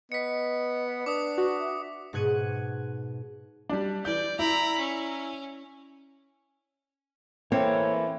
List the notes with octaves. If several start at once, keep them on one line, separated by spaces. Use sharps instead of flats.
B3 D#5 B6 C#7
D4 B4 D6 D#6
F#4
E5
G#2 B2 F#6 G#6 C#7 D#7
G3 D4
E3 D5 G6
E4 A#5 B5
C#4
E3 A#3 C4 A4 C#5